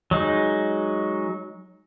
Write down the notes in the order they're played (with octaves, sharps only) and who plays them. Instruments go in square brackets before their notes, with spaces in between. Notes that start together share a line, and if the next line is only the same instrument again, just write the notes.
[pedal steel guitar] F#3 G#3 D#4